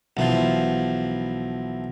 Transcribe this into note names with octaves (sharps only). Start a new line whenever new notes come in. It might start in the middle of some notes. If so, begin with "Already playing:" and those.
B1 E3 F3